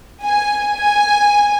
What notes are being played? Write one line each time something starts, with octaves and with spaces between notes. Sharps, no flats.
G#5
G#5